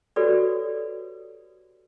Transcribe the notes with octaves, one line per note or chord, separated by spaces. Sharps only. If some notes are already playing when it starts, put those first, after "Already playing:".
F#4 G4 A4 B4 C#5 D5